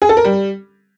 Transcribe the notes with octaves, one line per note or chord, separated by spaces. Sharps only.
G#4
A4
A#4
G3